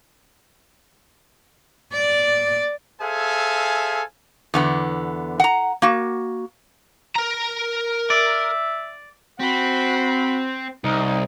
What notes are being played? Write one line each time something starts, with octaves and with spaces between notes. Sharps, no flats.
D5
G#4 A4 C5 E5 F5 G#5
E2 D3 B3
F#5 A#5
A#3 F#4
A#4 A#5
D5 E5
C4 F#4 B5
C2 D#4